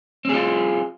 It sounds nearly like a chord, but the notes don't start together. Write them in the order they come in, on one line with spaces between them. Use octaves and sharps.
C4 G#4 F4